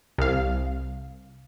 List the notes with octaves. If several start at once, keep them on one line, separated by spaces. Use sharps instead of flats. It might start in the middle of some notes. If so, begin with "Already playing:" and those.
C2 F5